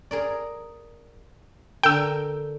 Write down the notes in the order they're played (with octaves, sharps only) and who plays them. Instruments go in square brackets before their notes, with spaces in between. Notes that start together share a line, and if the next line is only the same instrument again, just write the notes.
[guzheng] G#4 A#4 D5
[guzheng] D3 A#4 [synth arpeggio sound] G5 E6